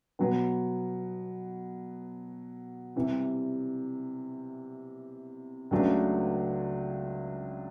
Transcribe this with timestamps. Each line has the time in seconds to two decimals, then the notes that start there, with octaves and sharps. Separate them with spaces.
0.19 B2 F#3 B3
2.96 C3 E3 G3
5.71 C#2 C#3 F#3 A3 D4